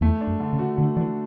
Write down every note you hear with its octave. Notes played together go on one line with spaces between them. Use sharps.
E2 A3
D4
F#2
D3
C#3
F#4
D3 A3
E3 D4